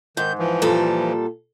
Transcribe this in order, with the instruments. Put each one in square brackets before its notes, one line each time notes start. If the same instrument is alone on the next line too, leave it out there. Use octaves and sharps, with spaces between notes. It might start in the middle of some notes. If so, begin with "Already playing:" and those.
[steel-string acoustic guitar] G#2 [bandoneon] D#3 G6
[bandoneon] E3 F3
[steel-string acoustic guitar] A#2 G3 A4